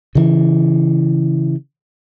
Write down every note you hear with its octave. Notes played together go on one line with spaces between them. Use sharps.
C#3 E3